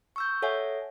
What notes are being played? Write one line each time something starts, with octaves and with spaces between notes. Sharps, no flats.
C#6 E6 G6
A4 C#5 E5 F#5 G#5